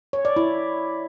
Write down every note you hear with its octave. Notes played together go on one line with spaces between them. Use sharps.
C#5
D5
E4